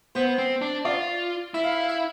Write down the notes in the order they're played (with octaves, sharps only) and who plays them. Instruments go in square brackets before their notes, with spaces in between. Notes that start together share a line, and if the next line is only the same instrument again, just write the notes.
[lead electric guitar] B3 [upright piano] C5
[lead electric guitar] C4
D4
[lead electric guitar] F4 [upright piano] D5
[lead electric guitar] E4 [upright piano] E5
[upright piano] F5
E5
F5
E5